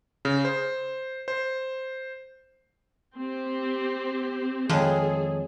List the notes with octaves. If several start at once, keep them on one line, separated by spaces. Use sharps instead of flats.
C#3
C5
C5
C4 G4
F2 D#3 G#3 G#4 A4 C#5